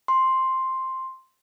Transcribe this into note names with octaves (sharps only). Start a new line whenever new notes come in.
C6